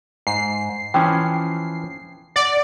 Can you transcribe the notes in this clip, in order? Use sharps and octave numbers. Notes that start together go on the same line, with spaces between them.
G#2 C7
E3 F3 C#4 G5
D5 F#5